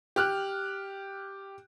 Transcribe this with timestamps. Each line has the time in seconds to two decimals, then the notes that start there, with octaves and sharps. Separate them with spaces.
0.16 G4 F6 F#6